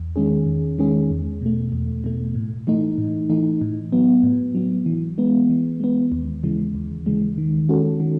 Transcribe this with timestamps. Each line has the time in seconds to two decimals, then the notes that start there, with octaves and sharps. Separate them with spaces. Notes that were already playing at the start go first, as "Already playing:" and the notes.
Already playing: E2
0.16 D#3 G#3 C#4 G#4
0.47 E2
0.79 D#3 G#3 C#4 G#4
1.10 E2
1.41 B2 A3
1.72 E2
2.04 B2 A3
2.35 A2
2.67 E3 A3 D#4
2.98 A2
3.30 E3 A3 D#4
3.61 A2
3.92 F#3 B3
4.23 A2
4.55 F#3 B3
4.86 E3
5.18 G#3 B3
5.50 E3
5.80 G#3 B3
6.12 D#2
6.43 C#3 E3 G#3
6.75 D#2
7.06 C#3 E3 G#3
7.38 D#3
7.69 G#3 C#4 F#4 A4
8.00 D#3